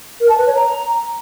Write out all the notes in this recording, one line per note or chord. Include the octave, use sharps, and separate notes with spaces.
A#4
A5
B4
C#5
A#5